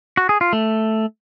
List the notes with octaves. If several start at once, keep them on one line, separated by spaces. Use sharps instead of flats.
F#4
G#4
F4
A3